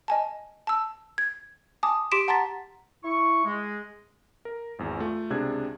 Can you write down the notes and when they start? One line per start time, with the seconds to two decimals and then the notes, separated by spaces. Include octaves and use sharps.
0.08 D#5 G#5 A5
0.67 A5 E6
1.18 G#6
1.83 G#5 A5 D6 D#6
2.12 G4 C6 D6 B6 D7 E7
2.28 F#5 A5 A#5 C6 A6 B6
3.05 E4 C#6
3.45 G#3
4.45 A#4
4.79 G#1 E2
4.98 A3 F4
5.30 C#2 C3 D4 G#4 F#6 G#6